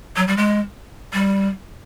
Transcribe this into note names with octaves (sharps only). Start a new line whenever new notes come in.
F#3
G3
G#3
G3